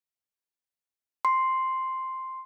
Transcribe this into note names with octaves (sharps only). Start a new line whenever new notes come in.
C6